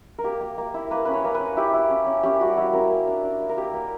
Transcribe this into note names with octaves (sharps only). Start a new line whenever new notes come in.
A#4
A#3 G4
A#3
A#3
E4
A#3 B4
C#4 B4
C#5
A#3
B4
C#4
E4 G4
E4
C#4
C#4
C#4 G4
G3 F#4
E4 G4
C#4 A#4
A#3
D4
D4
A#3
A#4
A#3 G4
A#3